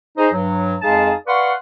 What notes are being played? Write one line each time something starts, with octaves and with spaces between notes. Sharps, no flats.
D#4 G#4 C5 A#5
G2 F#3
F2 G#3 D#4 G#4 F5 A5
B4 D5 F5 F#5 C6 C#6